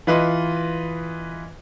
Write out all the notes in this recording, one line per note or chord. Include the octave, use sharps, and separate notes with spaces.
E3 F4 B4 D#5 C6